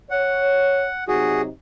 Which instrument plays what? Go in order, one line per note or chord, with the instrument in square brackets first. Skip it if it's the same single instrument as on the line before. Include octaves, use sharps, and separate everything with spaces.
[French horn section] C#5 [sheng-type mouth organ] F#5
[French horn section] C3 F#3 D#4 [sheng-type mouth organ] F#4 G#4